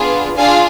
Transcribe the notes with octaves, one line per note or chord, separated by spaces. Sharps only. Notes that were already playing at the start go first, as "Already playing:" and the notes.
Already playing: B3 D4 F4 G#4
D4 F4 G#4 F5 G#5